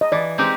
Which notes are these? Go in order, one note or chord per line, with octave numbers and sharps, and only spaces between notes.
D#5
E3 D5
G#3 C4 D#4 G4